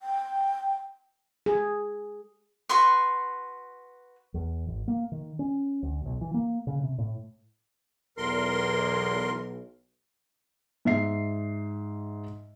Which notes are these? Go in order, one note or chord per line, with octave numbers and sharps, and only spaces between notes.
G5
G#4
F#4 B4 C6 C#6
E2
G#1
A#3
D#3
C#4
D2
B1
E3
A#3
C#3
C3
A2
B1 E2 A#4 C6
G#2 E5 C7